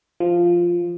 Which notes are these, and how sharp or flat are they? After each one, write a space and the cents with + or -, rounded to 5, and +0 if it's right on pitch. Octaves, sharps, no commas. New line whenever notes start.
F3 -5